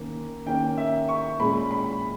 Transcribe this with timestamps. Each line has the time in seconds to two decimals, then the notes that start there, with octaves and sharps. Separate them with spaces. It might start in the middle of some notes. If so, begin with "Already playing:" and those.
Already playing: D#3 A#3 C#4
0.46 D#3 A#3 C#4 G5
0.77 E5
1.09 C#6
1.39 A#2 G#3 C#4 B5
1.71 B5